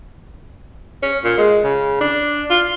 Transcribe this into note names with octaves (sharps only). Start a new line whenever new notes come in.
C#4
A#2
G#3
C#3
D4
F4